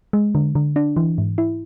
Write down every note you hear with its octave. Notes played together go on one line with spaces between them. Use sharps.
G#3
D3
D3
D4
E3
G#2
E4